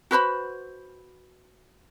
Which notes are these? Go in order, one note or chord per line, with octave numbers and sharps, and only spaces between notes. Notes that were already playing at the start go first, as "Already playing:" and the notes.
F#4 B4 C5 B5